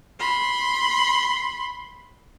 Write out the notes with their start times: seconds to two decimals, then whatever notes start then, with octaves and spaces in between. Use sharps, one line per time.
0.20 B5 C6